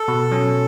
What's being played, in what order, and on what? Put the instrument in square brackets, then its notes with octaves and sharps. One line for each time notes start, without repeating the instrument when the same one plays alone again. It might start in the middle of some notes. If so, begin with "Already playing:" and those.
Already playing: [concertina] A4
[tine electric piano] B2
F#3 C#4